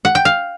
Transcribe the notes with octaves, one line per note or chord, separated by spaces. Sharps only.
F#5
G5
F5